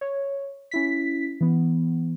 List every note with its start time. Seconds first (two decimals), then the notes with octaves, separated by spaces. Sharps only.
0.01 C#5
0.71 C#4 E4 B6
1.41 E3 B3